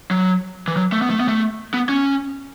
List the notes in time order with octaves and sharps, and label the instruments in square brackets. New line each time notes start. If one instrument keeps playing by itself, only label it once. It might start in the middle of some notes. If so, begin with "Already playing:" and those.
[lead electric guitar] F#3
E3
F#3
A3
B3
A3
B3
A3
B3
C#4